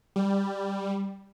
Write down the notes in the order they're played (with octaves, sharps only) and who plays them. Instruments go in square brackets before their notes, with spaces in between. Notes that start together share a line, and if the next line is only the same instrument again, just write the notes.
[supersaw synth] G3